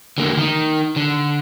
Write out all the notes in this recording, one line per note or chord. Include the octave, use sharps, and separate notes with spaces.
D3 A#3
D#3 D#4
D3